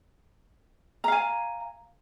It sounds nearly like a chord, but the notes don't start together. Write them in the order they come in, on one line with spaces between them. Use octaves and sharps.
A#5 F5 G#5